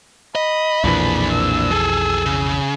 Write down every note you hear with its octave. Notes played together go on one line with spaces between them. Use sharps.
D#5 B5
B1 F2 A#2 E3 D4
E6
G#4 A4
C#3